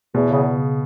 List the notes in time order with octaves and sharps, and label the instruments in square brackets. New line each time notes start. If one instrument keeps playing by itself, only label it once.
[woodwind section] E2 [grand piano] B2
[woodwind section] C#3
C#3